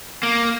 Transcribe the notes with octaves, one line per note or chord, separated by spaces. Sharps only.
A#3